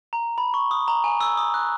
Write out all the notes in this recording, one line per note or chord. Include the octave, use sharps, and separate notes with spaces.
A#5
B5
C#6
D#6
A#5
G#5
E6
D#6
F#6